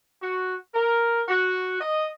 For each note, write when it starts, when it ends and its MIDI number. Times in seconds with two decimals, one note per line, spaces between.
0.21 0.54 66
0.74 1.22 70
1.28 1.78 66
1.80 2.07 75